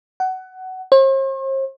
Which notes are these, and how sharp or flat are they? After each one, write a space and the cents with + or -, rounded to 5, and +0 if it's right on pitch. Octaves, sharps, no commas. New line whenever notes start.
F#5 +20
C5 +45